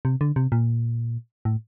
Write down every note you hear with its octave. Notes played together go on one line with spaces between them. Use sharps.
C3
D3
C3
A#2
A2